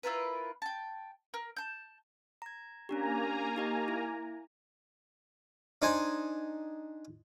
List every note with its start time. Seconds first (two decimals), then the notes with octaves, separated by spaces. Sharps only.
0.03 E4 F4 A#4 B4
0.62 G5 A5
1.34 A#4
1.56 A5 G6
2.42 A#5 G#6
2.89 A#3 C#4 D4 G4 G#5 A#5
3.56 D#4 G4 D#5
3.88 E4
5.82 D4 D#4 C5 G#5